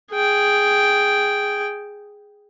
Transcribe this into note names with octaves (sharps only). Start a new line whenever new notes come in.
G#4 G5